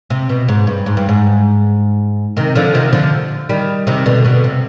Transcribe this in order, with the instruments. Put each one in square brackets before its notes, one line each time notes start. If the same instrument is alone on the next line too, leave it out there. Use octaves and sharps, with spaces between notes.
[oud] C3
B2
G#2
G2
G#2
G2
G#2
C3 D#3
D3 F3
C3 D#3
D3 F3
D#3 G3
C3 D#3
B2 D3
B2 D3
C3